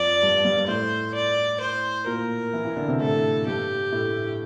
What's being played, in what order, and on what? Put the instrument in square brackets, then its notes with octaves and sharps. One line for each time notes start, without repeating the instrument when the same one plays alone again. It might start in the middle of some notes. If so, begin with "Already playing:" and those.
Already playing: [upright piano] F2 F3 [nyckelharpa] D5
[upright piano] G2 G3
G2 G3
[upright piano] A2 A3 [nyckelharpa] C5
[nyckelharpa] D5
C5
[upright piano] A#2 A#3 [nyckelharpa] A#4
[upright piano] E3 E4
E3 E4
D3 D4
C3 C4
[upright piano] A2 A3 [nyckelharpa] A4
[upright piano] G2 G3 [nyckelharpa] G4
[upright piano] A2 A3